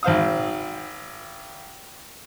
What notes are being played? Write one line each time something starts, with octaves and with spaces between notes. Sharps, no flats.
G#1 C5 F5 D#6